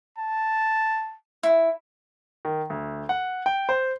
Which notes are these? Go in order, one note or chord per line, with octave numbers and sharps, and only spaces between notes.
A5
E4
D#3
D2
F#5
G5
C5